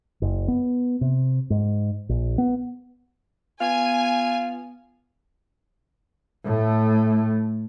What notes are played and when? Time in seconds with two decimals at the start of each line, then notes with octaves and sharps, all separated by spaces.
0.22 F#1
0.48 B3
1.01 C3
1.50 G#2
2.09 A#1
2.38 B3
3.61 B3 F4 G#5
6.45 A2 A3